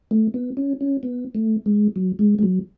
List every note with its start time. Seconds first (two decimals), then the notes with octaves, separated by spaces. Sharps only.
0.11 A3
0.34 B3
0.57 C#4
0.81 C#4
1.03 B3
1.35 A3
1.66 G#3
1.96 F#3
2.19 G#3
2.39 G#3
2.43 F#3